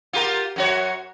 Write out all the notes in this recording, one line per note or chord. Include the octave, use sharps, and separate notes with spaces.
F4 G4 A#4
F#2 F#4 C#5